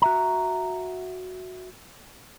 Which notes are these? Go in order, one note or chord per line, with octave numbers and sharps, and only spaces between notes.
F#4 E5 A#5